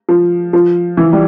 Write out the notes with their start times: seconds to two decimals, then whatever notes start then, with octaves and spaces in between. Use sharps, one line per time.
0.09 F3
0.53 F3
0.97 E3
1.13 G3